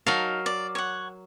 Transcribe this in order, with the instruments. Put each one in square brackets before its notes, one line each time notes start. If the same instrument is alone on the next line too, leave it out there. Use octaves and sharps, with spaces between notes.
[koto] F#3 A#4 F5 [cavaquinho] D#4 A5
[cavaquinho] D5
C#5 F#5